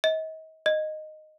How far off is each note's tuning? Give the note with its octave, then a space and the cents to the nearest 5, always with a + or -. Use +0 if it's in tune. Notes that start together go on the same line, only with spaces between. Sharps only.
D#5 +40
D#5 -10